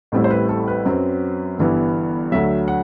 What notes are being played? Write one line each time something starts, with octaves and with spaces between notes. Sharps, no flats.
A1 A2 G3 C4 E4
C5
B4
A4
B4
F#2 F#3 C4
G1 G2 E3 B3 E4
D2 D3 F#3 E5
F#5